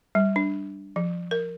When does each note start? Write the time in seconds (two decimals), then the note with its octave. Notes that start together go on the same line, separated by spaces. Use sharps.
0.15 G3
0.36 D4
0.96 F3
1.31 A#4